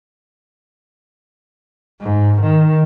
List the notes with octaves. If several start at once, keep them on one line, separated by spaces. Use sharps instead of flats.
G#2
D#3